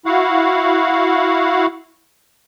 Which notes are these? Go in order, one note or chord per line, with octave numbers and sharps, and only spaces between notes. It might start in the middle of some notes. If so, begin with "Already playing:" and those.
E4 F#4 F5 F#5